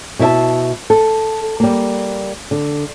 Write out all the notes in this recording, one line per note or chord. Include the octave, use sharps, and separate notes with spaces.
B2 E4 A#4 E5 A5
A4
G3 A#3
D3